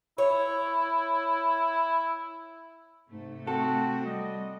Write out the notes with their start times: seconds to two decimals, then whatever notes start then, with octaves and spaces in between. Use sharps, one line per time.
0.18 E4 C#5
3.11 G#2 C3 A3
3.47 C4 F#4 A4
4.06 G3 D#5